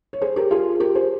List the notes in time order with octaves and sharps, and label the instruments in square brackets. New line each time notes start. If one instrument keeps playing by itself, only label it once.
[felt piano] C#5
G#4 C5
G4 A#4
F4 G#4
G4 A#4
G#4 C5